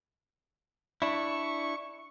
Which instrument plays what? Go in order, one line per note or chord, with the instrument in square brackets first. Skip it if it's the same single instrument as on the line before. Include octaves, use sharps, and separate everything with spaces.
[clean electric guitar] D4 E4 [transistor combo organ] C#6